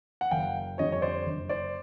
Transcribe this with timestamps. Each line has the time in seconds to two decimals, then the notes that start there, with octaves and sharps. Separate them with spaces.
0.21 F#5
0.31 F#1 F5 G5
0.78 F2 D3 G3 C#5 D#5
0.92 C#5
1.02 C5 D5
1.26 F#1
1.49 C5 D5